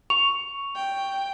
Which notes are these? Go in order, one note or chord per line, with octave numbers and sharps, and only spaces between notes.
C#6 F7
G5